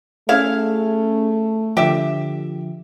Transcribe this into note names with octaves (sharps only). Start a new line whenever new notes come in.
A3 C#4 E4 G#4 F5
D3 F3 G4 E5